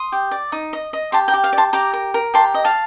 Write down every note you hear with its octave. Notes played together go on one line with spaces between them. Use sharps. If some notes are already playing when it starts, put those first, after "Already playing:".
Already playing: C6 D#6
G4
D5
D#4
D#5
D#5
G4 A5 C6
G5 A#5
G4
F5
D5
A5 C6
G4 A#5 D6
A#4
A#4
G4 A5 C6
D#5
F5 A5